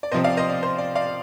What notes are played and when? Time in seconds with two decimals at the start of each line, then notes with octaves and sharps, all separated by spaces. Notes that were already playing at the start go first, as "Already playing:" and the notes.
0.03 D5
0.11 C3 F3 C4 C5 D#5
0.24 D5 F5
0.37 C5 D#5
0.50 D5
0.63 C5
0.78 D5
0.95 D5 F5